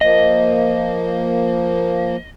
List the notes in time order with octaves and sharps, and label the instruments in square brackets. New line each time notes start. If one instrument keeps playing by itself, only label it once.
[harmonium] F3 A#3 [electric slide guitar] D#5